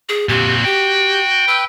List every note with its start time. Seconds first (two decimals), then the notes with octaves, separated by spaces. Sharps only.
0.09 G#4
0.29 A#2 C4 F#4 G4
0.65 G4 G5
1.48 B4 E6